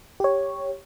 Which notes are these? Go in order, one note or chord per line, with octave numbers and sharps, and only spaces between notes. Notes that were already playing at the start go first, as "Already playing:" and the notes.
G4 C#5